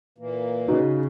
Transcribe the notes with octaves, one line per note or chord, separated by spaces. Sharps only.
A#2 E3 A#3
C#3 D#4 F#4